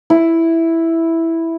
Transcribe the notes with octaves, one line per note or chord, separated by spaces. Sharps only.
E4